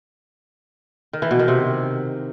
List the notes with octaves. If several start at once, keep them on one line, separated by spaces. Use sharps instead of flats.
D#3
E3
B2
D#3
C3